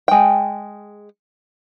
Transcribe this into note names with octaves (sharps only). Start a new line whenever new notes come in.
G#3 G5